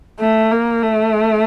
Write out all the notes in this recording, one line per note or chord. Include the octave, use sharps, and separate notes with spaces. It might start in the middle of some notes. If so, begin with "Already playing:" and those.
A3
A#3
A3